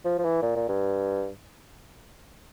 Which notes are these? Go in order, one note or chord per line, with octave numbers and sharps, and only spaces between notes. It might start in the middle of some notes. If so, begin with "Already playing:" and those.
F3
F3
E3
A#2
A#2
G2